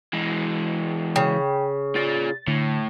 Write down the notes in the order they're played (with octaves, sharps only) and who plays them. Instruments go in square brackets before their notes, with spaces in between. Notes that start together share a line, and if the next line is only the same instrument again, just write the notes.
[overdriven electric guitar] E3 G#3
[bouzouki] C#3 [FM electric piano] G5
[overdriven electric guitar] F4 D5 [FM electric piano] A6
[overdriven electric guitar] A2 [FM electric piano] D3